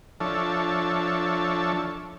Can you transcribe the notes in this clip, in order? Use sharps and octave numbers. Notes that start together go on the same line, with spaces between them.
F3 D4 A4 C#5 E5